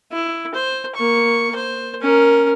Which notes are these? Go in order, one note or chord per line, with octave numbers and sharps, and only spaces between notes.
E4
C5
A#3 C#6
C5
C#4 A#4